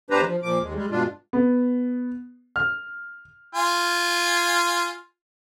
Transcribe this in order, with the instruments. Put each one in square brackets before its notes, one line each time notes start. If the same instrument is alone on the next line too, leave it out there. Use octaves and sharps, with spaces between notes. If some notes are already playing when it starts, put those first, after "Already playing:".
[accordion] E2 D4 G4 B4 C5 A#5
F3
A#2 F3 D6
D#2 G#3
G3 G#3
G2 B2 G#3 D4 F4
[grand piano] B3
F6
[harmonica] F4 G#5